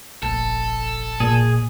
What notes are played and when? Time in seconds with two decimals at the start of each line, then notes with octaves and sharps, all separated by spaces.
0.23 F1 A#1 A4
1.20 A#2 G#4